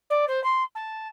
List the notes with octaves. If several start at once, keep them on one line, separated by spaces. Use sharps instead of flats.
D5
C5
C6
A5